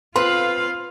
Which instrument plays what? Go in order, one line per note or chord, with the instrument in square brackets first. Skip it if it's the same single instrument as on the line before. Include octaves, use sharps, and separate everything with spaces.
[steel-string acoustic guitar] C4 B4 [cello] F4 F5 [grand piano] C6